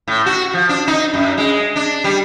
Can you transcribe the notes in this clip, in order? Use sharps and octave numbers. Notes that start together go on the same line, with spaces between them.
A2
F#4
F3
D4
D#4
F#2
G#3
D4
G3